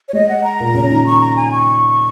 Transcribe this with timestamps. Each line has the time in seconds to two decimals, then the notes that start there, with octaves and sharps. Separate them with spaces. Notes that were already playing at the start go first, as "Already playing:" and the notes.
0.09 C#5
0.13 G#3 D#5
0.29 F#5
0.44 A#5
0.60 A#2 A#3
0.74 C#3 C#4
0.90 D#3 D#4
1.06 C#6
1.21 A#5
1.36 G#5
1.52 C#6